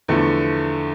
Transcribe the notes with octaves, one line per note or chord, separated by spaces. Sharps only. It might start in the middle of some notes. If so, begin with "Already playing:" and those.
E2 D3 F3 A3